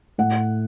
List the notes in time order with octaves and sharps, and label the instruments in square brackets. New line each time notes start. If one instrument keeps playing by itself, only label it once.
[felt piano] A2 F#5